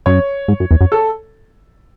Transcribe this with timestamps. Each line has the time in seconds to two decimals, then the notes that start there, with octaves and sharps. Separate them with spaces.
0.06 F#2 C#5
0.48 G#2
0.60 F#2
0.71 E2
0.81 F#2
0.92 A4